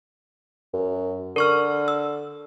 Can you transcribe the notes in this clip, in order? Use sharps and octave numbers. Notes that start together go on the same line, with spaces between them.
F#2
D3 A#4 C#6 F6
E6